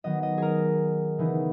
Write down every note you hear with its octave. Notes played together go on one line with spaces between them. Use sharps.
D#3 F#3 B3 D#5
D#5
G#4 A#4
C#3 E3 B3 D#4